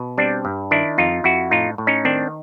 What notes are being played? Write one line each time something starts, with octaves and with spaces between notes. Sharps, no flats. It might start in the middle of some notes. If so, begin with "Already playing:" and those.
Already playing: B2
G3 C4 D4
G2
D#3 D4 E4
F2 D#4 F4
F2 E4 F#4
A2 D#4 F4
A2
C#4 D#4
D#3 C4 D4